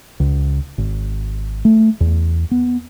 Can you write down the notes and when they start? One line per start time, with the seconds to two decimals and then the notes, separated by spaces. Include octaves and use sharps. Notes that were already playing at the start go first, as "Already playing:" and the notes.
0.20 C#2
0.78 G#1
1.65 A3
2.00 E2
2.51 B3